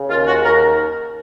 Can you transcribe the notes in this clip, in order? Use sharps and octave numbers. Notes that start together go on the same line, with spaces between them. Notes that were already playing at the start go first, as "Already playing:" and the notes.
Already playing: C#3
D#2 F4
F#4
D#2 A#4